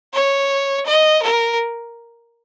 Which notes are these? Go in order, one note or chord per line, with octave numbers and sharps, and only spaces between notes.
C#5
D#5
A#4